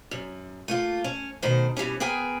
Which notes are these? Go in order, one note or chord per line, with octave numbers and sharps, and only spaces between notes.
F#2
A3 A#3 F4
C#4
B2 D#3 A3 C5
B2 E3 G3 C#4
B3 G#4 A#4 G5 G#5